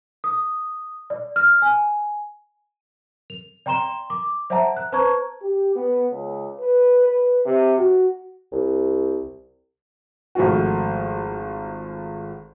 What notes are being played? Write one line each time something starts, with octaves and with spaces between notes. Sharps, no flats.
D#6
D5
F6
G#5
F7
D5 G5 A#5 C6 E7 G7
D6
C5 D5 E5 F#5 A5 A#5
F#6
B4 C5 A5 A#5 C#6 G#6
G4
B3
C#2
B4
B4
C3
F#4
C2
G#1 F3 A3 F4 F#4